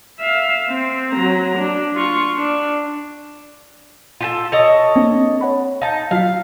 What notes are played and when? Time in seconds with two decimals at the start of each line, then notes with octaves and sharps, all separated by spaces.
0.20 E5 F5
0.70 C4
1.12 F#3 A#5
1.58 D4
1.96 F4 C#6
2.38 D4
4.21 F4 G4 A4
4.52 A4 C#5 D#5
4.96 A#3 C4 D4
5.41 C#5 F#5 B5
5.82 D#4 F5 A5
6.11 F#3 F4 F5 B6